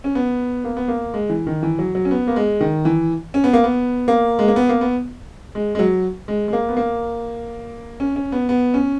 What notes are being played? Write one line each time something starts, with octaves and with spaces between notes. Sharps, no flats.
C#4
B3
A#3
B3
A#3
G#3
E3
D#3
E3
F#3
F#3
C#4
B3
A#3
G#3
D#3
E3
C#4
B3
A#3
B3
A#3
G#3
A#3
B3
A#3
B3
G#3
G#3
F#3
G#3
G#3
A#3
B3
A#3
C#4
C#4
B3
B3
C#4